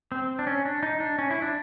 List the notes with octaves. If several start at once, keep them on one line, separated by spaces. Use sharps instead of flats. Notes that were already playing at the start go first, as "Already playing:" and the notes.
C4
D4
C#4
D4
D#4
D4
C#4
E4
D4